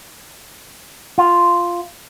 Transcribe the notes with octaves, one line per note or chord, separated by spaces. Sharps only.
F4